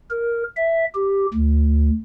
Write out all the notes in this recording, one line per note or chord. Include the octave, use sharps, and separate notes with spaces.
A#4
E5
G4
D2